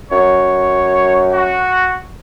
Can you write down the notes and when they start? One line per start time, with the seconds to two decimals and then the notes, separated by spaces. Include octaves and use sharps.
0.12 F#2 C#5
1.32 F#4